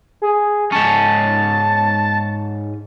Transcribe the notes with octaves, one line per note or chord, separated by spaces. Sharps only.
G#4
G#2 C#4 A5